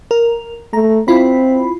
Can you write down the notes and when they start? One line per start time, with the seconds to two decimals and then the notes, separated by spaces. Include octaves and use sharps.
0.11 A#4
0.73 A3 A#5
1.08 C4 E4 F4 B5